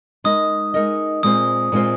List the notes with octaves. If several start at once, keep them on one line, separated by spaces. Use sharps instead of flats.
G#3 D#4 A#4 D#5 D#6
G#3 D#4 A#4 D#5
A#2 G#3 C4 F4 C5 D#6
A#2 G#3 C4 F4 C5